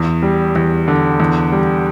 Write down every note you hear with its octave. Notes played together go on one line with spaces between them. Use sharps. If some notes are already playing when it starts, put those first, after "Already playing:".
Already playing: E2
G3
E2
D3
E2
G3